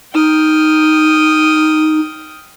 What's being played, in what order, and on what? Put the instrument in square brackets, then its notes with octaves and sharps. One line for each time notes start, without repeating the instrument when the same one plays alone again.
[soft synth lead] D#4 [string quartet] G5 D#6 F6